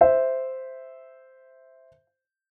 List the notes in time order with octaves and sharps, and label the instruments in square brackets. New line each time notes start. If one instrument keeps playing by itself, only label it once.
[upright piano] C5 E5